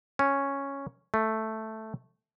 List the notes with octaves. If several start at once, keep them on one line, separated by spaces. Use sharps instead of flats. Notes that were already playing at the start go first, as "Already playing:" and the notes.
C#4
A3